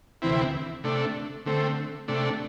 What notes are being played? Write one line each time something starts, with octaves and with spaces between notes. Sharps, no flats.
D2 C3 E3 C4 E4
C3 A3 D4
D3 A3 C4
C3 A3 D4